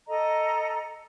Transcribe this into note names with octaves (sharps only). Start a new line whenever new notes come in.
A4 D#5 A#5